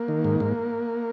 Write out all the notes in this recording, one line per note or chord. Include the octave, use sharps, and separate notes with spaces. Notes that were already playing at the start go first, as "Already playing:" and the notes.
Already playing: A#3
D#3
G#2
G#2